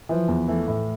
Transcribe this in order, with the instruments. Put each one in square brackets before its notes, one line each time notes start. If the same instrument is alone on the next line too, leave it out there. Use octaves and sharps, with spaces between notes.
[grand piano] E3 [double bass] F3
[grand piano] E2
[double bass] E3 [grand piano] A3
[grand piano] A2